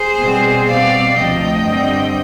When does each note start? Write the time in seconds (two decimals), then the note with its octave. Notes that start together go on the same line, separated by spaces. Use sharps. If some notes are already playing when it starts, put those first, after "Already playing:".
Already playing: G#4 C5
0.19 B2 G3 C4
0.68 B2 G3 C4 D5 F5
1.17 D2 C3 F3 D#5 G5
1.66 G2 D3 G3 C4